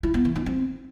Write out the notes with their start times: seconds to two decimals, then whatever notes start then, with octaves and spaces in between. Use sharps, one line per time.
0.03 E4
0.14 B3
0.25 E3
0.36 D#4
0.46 C4